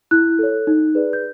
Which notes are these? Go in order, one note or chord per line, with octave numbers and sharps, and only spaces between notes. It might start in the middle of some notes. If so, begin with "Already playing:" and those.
E4 F#6
A4 C#5
D#4
G#4 B4 D5
G6